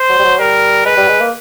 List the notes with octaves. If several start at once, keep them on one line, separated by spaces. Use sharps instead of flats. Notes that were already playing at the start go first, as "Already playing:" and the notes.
Already playing: C5
F#3
G3
F#3
G3 A#4
G#3 B4
G3
G#3
A#3